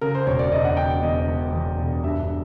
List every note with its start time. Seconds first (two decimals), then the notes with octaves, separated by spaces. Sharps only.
0.01 C#3 A#4
0.15 C5
0.27 E1 C#5
0.39 D5
0.52 E1 D#5
0.65 F#5
0.77 E1 G5
1.02 E2 D#5
1.28 E1
1.53 E2
1.78 E1
2.03 G2 E5